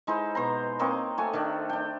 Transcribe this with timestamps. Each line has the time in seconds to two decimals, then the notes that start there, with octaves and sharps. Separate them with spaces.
0.07 G#3 D#4 E4 C5
0.35 B2 C5 A#5
0.79 A#3 C4 C#5 D#5
1.18 A3 F#4 G#5
1.33 D#3 A3 D4
1.69 D4 G5